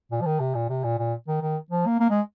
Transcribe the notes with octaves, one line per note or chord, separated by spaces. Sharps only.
A#2
F3
D#3
C3
A#2
C3
A#2
A#2
D#3
D#3
F3
A#3
A#3
G#3